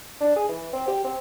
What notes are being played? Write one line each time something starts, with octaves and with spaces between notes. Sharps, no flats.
D4
G#4
E3
C4
G4
C4